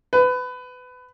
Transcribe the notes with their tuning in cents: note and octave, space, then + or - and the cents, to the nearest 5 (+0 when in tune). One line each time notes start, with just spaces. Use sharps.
B4 +25